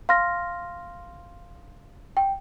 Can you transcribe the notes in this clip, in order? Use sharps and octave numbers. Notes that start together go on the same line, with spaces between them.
F5 C6 F6 A#6
G5